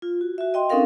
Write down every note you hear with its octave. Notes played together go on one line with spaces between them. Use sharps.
F4
F#4
F#4 E5
D#5 G5 C6
C4 C#4 D#4 A4 A#4 F5